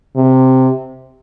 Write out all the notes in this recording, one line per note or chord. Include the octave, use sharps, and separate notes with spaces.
C3